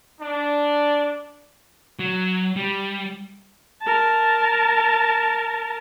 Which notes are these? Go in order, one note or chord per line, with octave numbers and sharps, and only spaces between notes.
D4
F#3
G3
A#4 A5